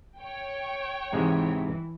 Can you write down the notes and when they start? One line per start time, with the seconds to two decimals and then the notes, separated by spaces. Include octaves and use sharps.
0.18 C#5 G5
1.13 G#2 C3 E3 G#3